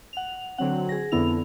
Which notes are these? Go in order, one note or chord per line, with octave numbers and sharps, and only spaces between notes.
F#5 F7
D3 F#3 C4 F#5
G#4 A#6
F2 D3 B3 E4 F7